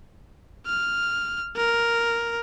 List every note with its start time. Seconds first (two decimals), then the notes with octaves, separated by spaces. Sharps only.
0.66 F6
1.57 A#4